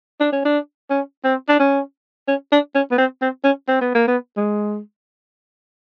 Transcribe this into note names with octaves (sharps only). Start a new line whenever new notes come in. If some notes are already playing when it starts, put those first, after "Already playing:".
D4
C#4
D4
C#4
C4
D4
C#4
C#4
D4
C#4
B3
C4
C4
C#4
C4
B3
A#3
B3
G#3